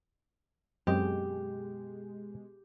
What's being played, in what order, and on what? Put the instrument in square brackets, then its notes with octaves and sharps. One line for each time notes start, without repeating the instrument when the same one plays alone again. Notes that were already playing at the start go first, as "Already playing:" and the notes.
[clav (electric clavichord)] F#2 C4 D#5 [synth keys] B2 G#3 [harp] G4